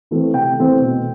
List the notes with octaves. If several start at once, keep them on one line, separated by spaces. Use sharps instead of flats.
E3 A3 C4
C3 G5
E3 A3 C4
B2